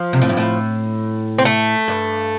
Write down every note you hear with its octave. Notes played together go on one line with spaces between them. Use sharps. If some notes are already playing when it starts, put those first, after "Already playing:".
Already playing: F3
C3
A2
G2
A2
C4
A3
G2